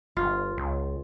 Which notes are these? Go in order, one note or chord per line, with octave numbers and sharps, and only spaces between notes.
G1 F4
C#2